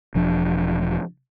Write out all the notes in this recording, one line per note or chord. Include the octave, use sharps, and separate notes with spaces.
E1 F3 D4